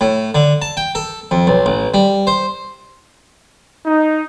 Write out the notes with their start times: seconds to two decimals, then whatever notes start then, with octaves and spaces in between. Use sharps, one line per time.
0.01 A2
0.35 D3
0.62 A5
0.77 G5
0.95 A4
1.31 F2
1.47 B1
1.66 A1
1.94 G3
2.27 C5
3.86 D#4